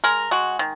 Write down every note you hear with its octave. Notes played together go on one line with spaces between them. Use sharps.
G#3 A#4
G#3 F#4
D#3